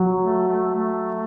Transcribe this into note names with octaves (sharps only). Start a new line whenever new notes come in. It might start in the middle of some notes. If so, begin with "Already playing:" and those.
Already playing: F#3
A3
A3
A3